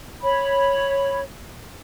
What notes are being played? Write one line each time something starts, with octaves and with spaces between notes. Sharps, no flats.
C#5 B5